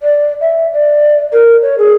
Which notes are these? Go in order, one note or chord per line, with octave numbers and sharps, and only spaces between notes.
D5
E5
D5
A#4
C#5
G#4